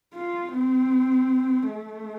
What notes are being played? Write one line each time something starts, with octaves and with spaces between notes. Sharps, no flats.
F4
C4
A3